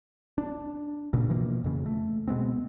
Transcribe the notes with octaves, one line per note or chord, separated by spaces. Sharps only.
D4
G2 A#2 C#3
B2 E3 F3 A#3
F2 C#3
A3
B2 G#3 B3 C4